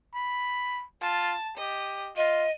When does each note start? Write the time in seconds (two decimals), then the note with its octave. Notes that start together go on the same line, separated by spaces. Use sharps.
0.14 B5
1.02 F4 A5
1.57 G4 D#5
2.17 F4 D#5 D#7